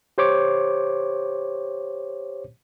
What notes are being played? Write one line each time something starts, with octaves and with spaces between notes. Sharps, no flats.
G4 C5 C#5 D6